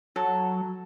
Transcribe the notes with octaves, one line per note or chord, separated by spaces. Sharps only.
F#3 A4